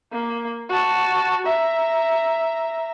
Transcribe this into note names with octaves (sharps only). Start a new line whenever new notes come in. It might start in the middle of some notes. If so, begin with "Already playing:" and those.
A#3
F#4 A5
E5 A#5